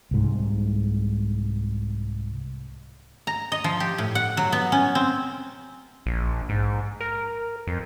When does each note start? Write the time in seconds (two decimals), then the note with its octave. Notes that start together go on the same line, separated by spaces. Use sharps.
0.11 C2 G#2
3.27 A#5
3.52 D#5
3.64 F3
3.80 G4
3.98 A2
4.15 F#5
4.37 F#3
4.52 B3
4.72 C#4
4.95 C4
6.06 A#1
6.49 G#2
7.01 A#4
7.67 F2